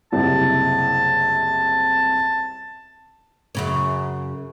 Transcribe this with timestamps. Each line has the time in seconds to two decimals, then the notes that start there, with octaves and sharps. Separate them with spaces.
0.12 F#1 C2 C3 A5
3.55 F#2 C#3 C#4